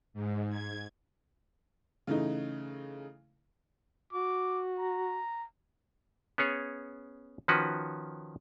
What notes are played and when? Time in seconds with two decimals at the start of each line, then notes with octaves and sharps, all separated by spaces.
0.14 G#2
0.50 G#6
2.07 C#3 E3 A3 D#4
4.13 F#4 D6
4.79 A#5
6.38 B3 C#4 G#4 C#5
7.48 D#3 F3 C#4 F#4 B4